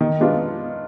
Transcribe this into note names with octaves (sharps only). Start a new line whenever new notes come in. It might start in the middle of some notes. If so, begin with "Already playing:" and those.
D#3
G#3 B3 D4 F4